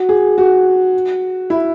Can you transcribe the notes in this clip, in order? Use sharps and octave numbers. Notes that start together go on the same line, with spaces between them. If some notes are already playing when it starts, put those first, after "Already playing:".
Already playing: F#4
G#4
F#4
E4